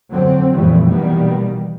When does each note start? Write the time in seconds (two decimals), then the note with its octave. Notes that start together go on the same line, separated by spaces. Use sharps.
0.11 F2 D3 F#3 C4
0.50 F2 A#2 C#3 E3 G3 A3
0.87 B2 D#3 E3 G3 A#3 B3